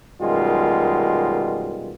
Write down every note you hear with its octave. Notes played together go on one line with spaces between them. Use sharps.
F#2 B2 D#3 G3 G#3 F4